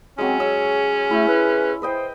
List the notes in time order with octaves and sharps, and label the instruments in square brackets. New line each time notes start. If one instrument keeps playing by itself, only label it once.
[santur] F#3 G#3 [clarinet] C4 [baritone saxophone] C#4
[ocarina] G#4 [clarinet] C#5 [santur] E6
[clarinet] A3 [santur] E4
[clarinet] B4
[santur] B4 D#5 G5 [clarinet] C5